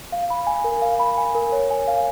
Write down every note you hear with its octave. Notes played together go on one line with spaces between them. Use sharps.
F5
B5
G#5
A#4
F5
B5
G#5
A#4
C#5
G#5
F5